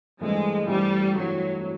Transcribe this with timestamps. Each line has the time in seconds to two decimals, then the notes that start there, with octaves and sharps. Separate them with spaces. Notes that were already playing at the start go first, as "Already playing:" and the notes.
0.20 G2 E3 G#3 A3 C4 E4
0.67 G2 E3 G3 A3 C4 E4
1.14 G2 E3 F#3 A3 C4 E4
1.61 C4 E4